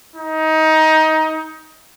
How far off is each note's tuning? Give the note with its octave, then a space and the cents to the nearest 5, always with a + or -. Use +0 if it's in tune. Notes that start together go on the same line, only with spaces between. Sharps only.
D#4 +20